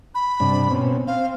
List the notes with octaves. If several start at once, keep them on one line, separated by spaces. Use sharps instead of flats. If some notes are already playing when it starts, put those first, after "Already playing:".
B5
G2 C3 D4
B2 C4 C#4
C4 F5